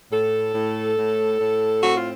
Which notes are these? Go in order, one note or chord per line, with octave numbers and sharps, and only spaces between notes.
A2 A4
A2
A2
A2
C4 F#4
F4